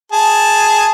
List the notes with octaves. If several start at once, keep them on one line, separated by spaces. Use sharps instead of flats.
G#4 A5